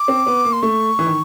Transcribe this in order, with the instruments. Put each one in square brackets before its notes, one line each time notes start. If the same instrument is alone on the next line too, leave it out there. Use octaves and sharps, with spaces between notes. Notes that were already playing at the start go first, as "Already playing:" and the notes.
Already playing: [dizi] D6
[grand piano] C4
B3
A#3
[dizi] C6
[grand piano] A3 [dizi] C#6
[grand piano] E3
D#3